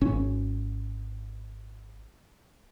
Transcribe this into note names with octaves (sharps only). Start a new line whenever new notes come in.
G#1 C#4